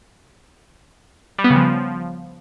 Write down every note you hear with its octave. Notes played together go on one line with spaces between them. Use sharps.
G3
B3
C#3
F3